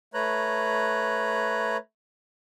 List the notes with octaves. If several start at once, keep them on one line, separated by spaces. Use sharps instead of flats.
A3 B4 C#5 A#5 F#6